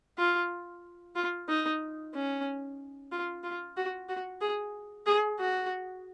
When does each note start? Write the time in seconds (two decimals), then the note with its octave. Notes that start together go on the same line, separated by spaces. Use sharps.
0.18 F4
1.15 F4
1.49 D#4
2.14 C#4
3.12 F4
3.43 F4
3.77 F#4
4.09 F#4
4.41 G#4
5.06 G#4
5.39 F#4